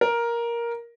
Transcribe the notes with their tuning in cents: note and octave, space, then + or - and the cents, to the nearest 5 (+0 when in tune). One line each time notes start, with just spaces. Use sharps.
A#4 +10